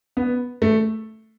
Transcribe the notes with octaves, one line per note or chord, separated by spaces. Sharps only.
B3
A3